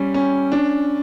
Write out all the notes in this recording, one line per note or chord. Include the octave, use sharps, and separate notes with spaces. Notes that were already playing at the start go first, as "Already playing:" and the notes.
Already playing: G3 C#4
C#4
D4